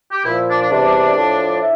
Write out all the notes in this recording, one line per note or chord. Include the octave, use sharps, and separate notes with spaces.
G4
A#2 F3 E4
D4
D4
E2 C3 G3 D4
A2 F3
E4